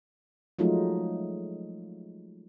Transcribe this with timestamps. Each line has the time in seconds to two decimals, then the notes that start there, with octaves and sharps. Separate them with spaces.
0.59 F3 F#3 G#3 A3 D#4 F4